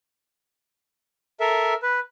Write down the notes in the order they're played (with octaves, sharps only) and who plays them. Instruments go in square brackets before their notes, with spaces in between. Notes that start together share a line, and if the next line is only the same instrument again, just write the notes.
[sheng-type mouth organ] A4 A#4 E5
B4